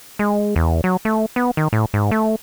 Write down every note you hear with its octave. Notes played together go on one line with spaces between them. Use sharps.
G#3
E2
F#3
A3
B3
D#3
A2
G#2
A3